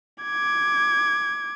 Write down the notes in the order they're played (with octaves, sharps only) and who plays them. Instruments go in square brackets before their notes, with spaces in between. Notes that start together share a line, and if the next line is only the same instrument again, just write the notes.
[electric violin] D6 G#6